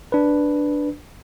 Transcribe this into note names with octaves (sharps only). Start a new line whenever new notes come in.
D4 B4